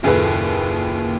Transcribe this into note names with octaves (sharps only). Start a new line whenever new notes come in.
F#1 D#2 A#2 G#4 A4 B4